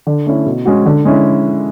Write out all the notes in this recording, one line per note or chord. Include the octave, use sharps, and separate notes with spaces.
D3
A3 C#4 E4
B2
G#3 C#4 F#4
D3
G#3 C#4 E4